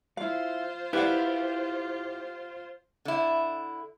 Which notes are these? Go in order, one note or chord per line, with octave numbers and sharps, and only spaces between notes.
E4 F4 C5 F5
E4 G4 B4 D5 F5 F#5
D3 E4